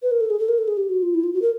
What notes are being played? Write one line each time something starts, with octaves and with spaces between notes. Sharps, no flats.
B4
A#4
A4
G#4
A4
A#4
A4
G#4
G4
F#4
F4
E4
F4
F#4
A#4